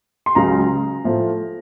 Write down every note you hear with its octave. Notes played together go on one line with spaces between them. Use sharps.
C6
C#2 C#3 F#3 A#5
A2 F3 A3